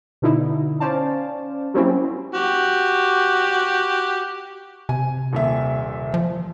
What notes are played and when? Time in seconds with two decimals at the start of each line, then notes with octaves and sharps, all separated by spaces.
0.22 B2 D3 D#4 E4
0.80 C#4 C5 D5 F5 A5
1.74 F#3 G3 A#3 C4 C#4 E4
2.35 F#4 G4
4.89 C3 G#5
5.33 D#1 A#2 E5
6.14 F3